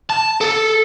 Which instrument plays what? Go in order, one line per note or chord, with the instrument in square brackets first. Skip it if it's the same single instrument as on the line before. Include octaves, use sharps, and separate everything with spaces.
[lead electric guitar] A5
A4